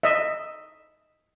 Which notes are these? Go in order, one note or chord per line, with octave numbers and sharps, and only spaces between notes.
D#5 E5